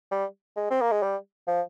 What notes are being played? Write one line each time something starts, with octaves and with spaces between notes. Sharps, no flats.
G3
G#3
C4
A#3
G#3
G3
F3